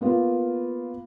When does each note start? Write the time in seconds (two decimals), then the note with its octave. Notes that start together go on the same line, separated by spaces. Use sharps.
0.01 A#3 B3 F4